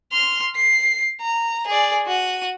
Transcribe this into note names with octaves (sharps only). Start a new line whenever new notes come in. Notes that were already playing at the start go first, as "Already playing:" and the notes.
C6 F6
C7
A#5
G#4 D5
F#4 D#7